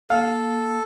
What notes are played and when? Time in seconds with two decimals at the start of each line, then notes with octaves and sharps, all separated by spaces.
0.10 A#3 A4 F5